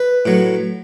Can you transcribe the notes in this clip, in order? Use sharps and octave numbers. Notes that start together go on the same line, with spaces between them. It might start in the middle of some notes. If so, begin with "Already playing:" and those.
Already playing: B4
A2 F#3